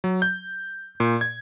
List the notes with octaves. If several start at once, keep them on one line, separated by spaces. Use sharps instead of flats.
F#3
G6
A#2
G#6